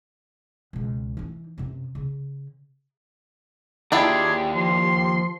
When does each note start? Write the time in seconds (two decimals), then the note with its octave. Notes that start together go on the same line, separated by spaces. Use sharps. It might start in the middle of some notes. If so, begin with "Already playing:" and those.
0.73 C#2 B2
1.17 E3 D#4
1.58 F#2 C3
1.95 C#3
3.92 D#2 D4 E4 F4 G4 G#4
4.55 F3 C6